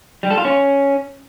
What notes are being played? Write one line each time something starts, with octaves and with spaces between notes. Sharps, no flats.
G3
A4
F4
C#4